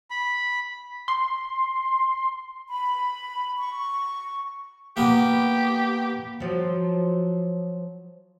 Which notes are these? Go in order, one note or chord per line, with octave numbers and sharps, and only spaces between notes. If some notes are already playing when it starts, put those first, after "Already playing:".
B5
C6
B5
C#6
A#3 B3 G4 B4
F3 F#3